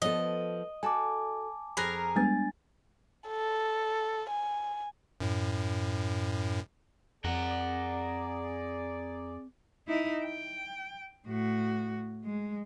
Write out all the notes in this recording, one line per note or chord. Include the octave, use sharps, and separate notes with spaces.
F3 B3 A4 D#5
F#4 A4 G#5 A5 D6
F2 G#4 A#4 B5 F#6 A#6
G3 G#3 B3 D4 G#5 A6
A4
G#5
F#2 A2
F2 C4 G#4 A#4 D5 F#5
D#4 E4
G5
A2 F#4
G#3